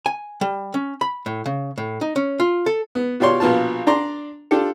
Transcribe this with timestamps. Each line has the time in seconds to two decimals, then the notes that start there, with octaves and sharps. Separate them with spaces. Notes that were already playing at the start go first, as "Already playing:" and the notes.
0.06 G#5
0.41 G3
0.74 C#4
1.01 B5
1.26 A2
1.46 C#3
1.78 A2
2.01 D#4
2.16 C#4
2.40 F4
2.66 A4
2.95 B3
3.20 B2 F4 G4 C#5 D5 C6
3.40 A#1 B2 B3 F4 A5
3.87 D4 D5 A#5 C6
4.51 D4 F4 G4 A4